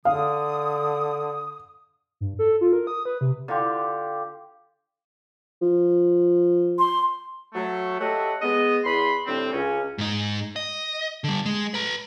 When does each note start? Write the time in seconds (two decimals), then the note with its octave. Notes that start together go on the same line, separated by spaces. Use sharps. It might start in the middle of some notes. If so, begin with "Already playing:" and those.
0.05 D3 F5 D#6
2.21 G2
2.39 A4
2.61 F4
2.73 A#4
2.87 D#6
3.05 B4
3.21 C3
3.48 D3 F4 G4
5.62 F3
6.79 C6
7.54 F#3 A3
7.99 G4 A4 C#5 D#5 E5 F#5
8.42 G#3 B3 D#5
8.85 E2 B5 C6
9.27 A2 D3 G3 C4
9.53 C#2 C#4
9.98 G#2 D#4
10.56 D#5
11.24 D3 G3
11.46 G#3
11.74 B4 A#5